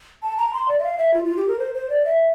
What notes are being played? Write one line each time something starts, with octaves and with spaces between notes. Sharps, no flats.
A5
A#5
C6
D5
E5
F5
E5
F4
F4
G4
A#4
C5
C5
D5
E5